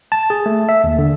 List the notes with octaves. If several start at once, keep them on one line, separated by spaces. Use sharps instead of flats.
A5
G#4
A3
E5
D#2
D3